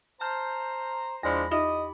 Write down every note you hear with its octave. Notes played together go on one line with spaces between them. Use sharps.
C5 A5 A#5 F6 G6
E2 F3 G#3 D4 B5 A#6
D#4 F4 G4 D#5 E5 B5